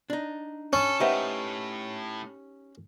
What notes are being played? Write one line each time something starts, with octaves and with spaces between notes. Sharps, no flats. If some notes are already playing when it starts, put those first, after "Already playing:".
D4 D#4
C#4 A4
A2 D#4 G4 B4 C5 E5 F#5